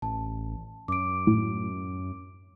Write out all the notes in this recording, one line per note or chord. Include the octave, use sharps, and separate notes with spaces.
A1 A5
F#2 D6 D7
A2